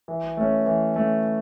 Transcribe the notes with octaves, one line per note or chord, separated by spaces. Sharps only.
E3
A3 C#4
E3
A3 C#4